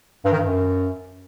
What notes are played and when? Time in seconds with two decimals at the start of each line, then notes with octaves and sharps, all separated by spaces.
0.25 G2
0.32 D#3
0.39 G2
0.46 F#2